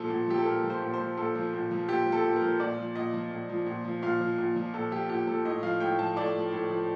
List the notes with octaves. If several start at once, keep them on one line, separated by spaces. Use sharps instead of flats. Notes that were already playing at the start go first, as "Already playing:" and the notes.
Already playing: A#2 F3 A4
A#2
F3 G4
A4
A#2 A#4
F3
C5
A#2
C5
F3
A#2 A4
F3
A#2
F3
A#2 G4
F3
A4
A#2
A#4
F3
A#2 D5
F3
A#2 D#5
F3
A#2
F3
A#2
F3
A#2 F5
F3
A#2
F3
A#2 A4
F3 G4
A#2 G4
F3 A4
A2 D#5
F3 F5
A2 G5
F3 A5
A2 D5
F3
A2
F3